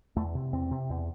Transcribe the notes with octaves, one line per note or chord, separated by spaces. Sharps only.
E2 A3
C3
E2 C4
C3
E2